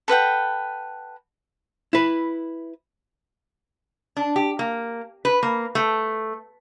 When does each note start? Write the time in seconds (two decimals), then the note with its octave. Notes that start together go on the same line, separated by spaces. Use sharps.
0.08 A4 B4 F#5 G5
1.93 E4 B4
4.17 D4
4.36 G4
4.59 A#3
5.25 B4
5.43 A#3
5.75 A3